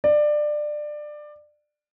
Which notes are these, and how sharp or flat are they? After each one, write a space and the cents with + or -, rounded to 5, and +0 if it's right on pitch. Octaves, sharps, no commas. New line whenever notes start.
D5 +20